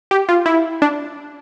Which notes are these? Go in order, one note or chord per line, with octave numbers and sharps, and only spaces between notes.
G4
F4
E4
D4